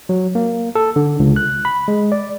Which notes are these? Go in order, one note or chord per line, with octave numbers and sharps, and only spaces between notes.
F#3
A#3
A4
D3
C#2
F#6
B5
G#3
D5